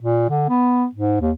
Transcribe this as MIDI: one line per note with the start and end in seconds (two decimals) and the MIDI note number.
0.01 0.25 46
0.29 0.45 50
0.49 0.87 59
0.95 1.21 44
1.21 1.31 39